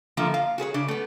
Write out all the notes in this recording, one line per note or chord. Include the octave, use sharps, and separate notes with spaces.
D3 F3 A3 A#3 F4
F5
F#4 G#4 B4 C#5
C#3 D4
A3 B3